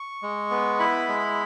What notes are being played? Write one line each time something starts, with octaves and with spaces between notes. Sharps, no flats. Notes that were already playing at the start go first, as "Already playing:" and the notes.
Already playing: C#6
G#3
B3
E4 B5
G#3